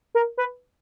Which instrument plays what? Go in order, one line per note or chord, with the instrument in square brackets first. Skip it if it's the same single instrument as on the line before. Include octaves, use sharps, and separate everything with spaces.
[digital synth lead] A#4
B4